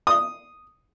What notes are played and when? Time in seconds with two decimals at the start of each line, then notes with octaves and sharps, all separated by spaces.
0.07 D#6